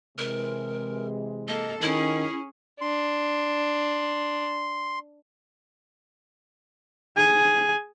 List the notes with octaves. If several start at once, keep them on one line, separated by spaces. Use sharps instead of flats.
C3 E3 G#3 A#4
A#3 A4 D#5
D#3 C#4 E4 G#4
D4 C6
G#4 G#5